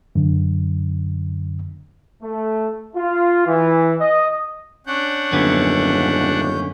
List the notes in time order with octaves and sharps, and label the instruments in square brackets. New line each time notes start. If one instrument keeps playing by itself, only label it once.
[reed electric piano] F#2 D3
[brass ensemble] A3
F4
E3
D#5
[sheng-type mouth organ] C#4 G6 [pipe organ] D4 F#5
[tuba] D#1 [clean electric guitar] F#2 D3 B3